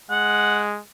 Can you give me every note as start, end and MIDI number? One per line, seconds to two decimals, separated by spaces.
0.11 0.80 56
0.11 0.63 78